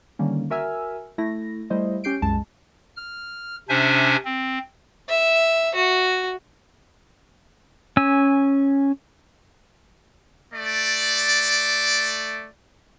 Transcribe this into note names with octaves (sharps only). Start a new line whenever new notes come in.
D3 D#3 G3 A#3 C#4
F#4 A#4 E5 G#5 E6 F6
A3 E4 A#6
G3 A3 E4 C5 D#5
C#4 G4 G6 C7 D7
C2 F#2 G#3 A5
F6
C3 C#4 D4 C5 E5 G#5
C4
E5
F#4
C#4 G#5 E6
A3 D5